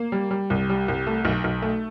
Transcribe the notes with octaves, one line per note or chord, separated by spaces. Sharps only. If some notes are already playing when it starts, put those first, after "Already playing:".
Already playing: A#3
G3
G3
C2
G3
C2
A3
B1
B1
A3